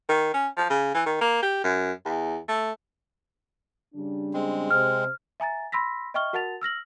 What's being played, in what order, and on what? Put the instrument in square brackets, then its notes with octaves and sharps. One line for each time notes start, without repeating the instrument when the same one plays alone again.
[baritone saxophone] D#3
C#4
F3
C#3
E3
D#3
A#3
G4
F#2
E2
A3
[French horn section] C#3 G3 D4
[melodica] G#3 C4
[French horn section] C3 C5 [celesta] F6
[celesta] E5 G#5 A#5 A6
B5 C6 E6 A#6 B6
D#5 E5 G5 C#6 F6 G7
F#4 A#4 F#5 A5 A6 F7
E6 F6 A#6 F#7